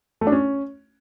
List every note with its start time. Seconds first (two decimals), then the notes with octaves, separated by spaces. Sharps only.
0.21 A3
0.27 D4
0.32 C#4